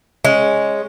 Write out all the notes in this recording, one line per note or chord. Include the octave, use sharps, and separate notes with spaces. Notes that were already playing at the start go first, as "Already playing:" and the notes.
G#3 C#4